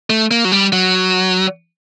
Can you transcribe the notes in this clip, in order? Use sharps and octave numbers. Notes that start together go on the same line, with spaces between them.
A3
A#3
F#3
G3
F#3